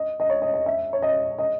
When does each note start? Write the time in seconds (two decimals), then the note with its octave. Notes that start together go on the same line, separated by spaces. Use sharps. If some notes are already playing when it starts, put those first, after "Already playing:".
Already playing: D#5
0.20 D#5
0.30 C#5
0.42 D#5
0.54 D#5
0.66 E5
0.93 C#5
1.02 D#5
1.38 D#5